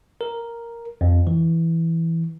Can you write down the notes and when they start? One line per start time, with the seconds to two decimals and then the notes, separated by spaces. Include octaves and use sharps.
0.21 A#4
1.01 F2
1.27 E3